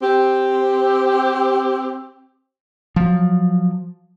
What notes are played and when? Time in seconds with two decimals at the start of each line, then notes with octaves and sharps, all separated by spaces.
0.01 C4 G4
2.96 F3 F#3